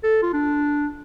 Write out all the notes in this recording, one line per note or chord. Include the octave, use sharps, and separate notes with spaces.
A4
F4
D4